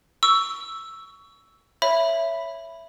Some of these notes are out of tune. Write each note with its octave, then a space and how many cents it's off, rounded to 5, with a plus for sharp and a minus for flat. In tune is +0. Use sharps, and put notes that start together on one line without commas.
C#6 +20 E6 +0
C#5 +0 E5 +10 B5 +0